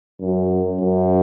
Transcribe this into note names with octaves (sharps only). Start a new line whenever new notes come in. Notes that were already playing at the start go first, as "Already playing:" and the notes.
F#2
F#2